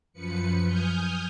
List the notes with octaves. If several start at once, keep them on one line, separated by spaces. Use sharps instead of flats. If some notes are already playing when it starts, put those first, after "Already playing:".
F#2 F3 B4 C#7
G#5 D#6 F6 G6